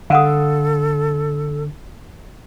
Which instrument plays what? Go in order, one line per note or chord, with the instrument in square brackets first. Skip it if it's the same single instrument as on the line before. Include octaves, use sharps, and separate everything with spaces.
[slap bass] D3 [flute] A4 [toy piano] F5 F#5 D#6